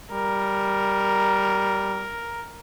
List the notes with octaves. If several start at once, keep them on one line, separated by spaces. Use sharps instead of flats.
G3 A#4